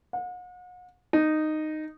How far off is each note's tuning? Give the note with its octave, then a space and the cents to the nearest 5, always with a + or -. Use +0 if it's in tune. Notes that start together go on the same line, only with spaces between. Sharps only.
F#5 -40
D#4 -10